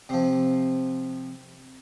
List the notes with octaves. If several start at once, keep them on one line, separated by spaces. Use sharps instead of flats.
C3 F3